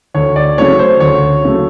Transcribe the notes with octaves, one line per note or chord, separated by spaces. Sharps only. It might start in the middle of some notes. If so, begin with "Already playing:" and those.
D2 C#5
D5
C#3 F#3 A3 C#5
C5
D2 C#5
C#3 F#3 A3